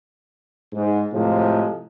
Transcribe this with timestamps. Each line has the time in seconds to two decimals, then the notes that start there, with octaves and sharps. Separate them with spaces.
0.73 G#2
1.13 A2 C3 F3 G#3